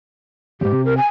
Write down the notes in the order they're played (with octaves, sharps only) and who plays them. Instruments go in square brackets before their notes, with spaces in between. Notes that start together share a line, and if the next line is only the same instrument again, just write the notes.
[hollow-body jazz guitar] E2 G#2 [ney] G4
[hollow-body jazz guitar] C3
[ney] A#4
G#5